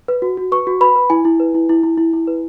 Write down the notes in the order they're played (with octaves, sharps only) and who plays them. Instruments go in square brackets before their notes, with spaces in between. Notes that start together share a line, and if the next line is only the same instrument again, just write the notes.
[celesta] B4
F#4
F#4
B4 C#6
F#4
B4 B5
B4
E4 G#5
E4
B4
E4
E4
E4
E4
E4
B4